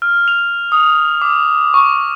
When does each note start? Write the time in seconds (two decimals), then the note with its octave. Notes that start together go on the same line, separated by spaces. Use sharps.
0.02 F6
0.28 F7
0.72 D#6
1.22 D6
1.74 C#6